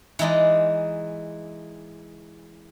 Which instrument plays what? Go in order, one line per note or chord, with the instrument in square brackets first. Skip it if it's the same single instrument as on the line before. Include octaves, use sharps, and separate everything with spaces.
[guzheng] E3 G#3 D#4 D5